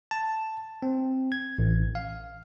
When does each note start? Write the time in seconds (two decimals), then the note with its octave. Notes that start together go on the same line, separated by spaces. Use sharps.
0.11 A5
0.82 C4
1.32 G#6
1.58 A1
1.95 F5